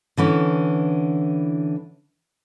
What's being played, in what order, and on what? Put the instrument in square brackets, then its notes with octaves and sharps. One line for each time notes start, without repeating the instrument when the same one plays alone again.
[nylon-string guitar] D3 E3 C#4